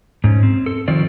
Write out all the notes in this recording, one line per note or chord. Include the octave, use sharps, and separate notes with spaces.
G#2 C#4
C4
A4
D#3 F3 C4 D5